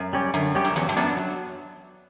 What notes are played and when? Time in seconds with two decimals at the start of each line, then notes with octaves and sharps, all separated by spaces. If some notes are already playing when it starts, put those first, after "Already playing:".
Already playing: F#2
0.13 G3 C#4 G4
0.34 F#2 D3
0.55 G3 C#4 G4
0.64 F#2
0.76 E2 F#3
0.89 G2
0.97 F#2 B3 D4
1.17 F#3